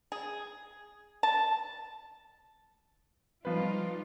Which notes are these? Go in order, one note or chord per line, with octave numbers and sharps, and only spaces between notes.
G#4
A5
F3 G3 D#4 F4 B4